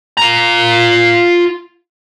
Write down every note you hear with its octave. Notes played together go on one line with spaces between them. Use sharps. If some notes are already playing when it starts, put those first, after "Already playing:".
F4 A#5